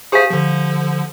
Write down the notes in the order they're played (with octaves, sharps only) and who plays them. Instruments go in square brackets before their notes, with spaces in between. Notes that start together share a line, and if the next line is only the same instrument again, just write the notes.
[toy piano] G4 F5 [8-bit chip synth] G#4 C5 G#5
[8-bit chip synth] D3 F3